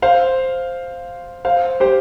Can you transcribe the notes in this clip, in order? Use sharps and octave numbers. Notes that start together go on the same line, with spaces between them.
C5 F5
C5 F5
G4 C5